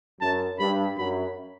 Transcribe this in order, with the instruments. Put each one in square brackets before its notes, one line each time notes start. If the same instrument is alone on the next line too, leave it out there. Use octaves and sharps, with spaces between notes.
[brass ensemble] F#2 [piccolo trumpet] A5
[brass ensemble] G2 [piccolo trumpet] B5
[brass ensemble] F#2 [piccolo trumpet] B5